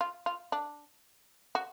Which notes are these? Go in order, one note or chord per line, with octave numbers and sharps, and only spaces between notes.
F4
F4
D4
F#4